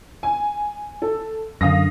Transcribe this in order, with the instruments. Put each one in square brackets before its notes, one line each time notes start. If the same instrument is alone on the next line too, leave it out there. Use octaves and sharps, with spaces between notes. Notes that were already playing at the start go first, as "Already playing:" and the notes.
[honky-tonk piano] G#5
A4
[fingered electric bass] F#2 D3 [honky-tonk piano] F5 D#6 A#6